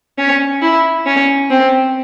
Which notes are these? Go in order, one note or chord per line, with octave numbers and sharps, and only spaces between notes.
C#4
E4
C#4
C4